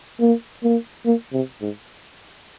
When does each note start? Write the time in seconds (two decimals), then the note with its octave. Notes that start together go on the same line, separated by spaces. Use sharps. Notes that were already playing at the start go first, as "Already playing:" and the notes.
0.20 A#3
0.63 A#3
1.06 A#3
1.33 C3
1.61 G#2